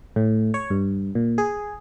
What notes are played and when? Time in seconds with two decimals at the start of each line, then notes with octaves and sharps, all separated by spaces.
0.16 A2
0.54 C#5
0.70 G2
1.15 A#2
1.38 G#4